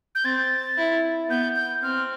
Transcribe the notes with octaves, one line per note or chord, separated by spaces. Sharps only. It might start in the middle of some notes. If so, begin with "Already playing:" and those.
G6
C4 A6
E4
B3 G6
G6
C4 F6